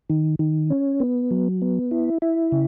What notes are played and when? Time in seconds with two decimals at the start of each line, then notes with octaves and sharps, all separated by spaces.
0.10 D#3
0.39 D#3
0.70 C#4
1.00 B3
1.31 F#3
1.62 B3
1.91 E4
2.22 E4
2.52 C#3